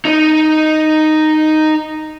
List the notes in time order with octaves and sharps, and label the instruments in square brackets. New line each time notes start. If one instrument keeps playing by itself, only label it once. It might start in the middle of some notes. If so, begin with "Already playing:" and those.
[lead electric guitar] D#4 D#5